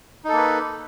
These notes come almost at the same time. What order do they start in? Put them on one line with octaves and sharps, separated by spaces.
D#4 A4 A#3 B4